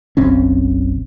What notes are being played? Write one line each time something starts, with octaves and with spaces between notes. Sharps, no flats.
F#1 B1 C4 C#4